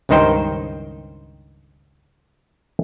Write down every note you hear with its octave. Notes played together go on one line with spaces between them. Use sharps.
C#2 G2 D#3 D#4 C5 G5